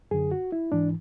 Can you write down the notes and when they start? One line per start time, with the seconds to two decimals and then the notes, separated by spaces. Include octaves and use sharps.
0.11 F#2 D3 G#4
0.31 F#4
0.52 E4
0.72 G#2 E3 D4